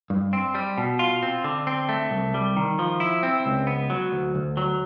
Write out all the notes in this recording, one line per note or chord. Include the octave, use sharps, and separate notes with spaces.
G2
C4
G3
B2
F4
C4
D3
C4
A3
C2
G3
D#3
F3
E4
C4
C#2
B3
F#3
D2
D2
F#3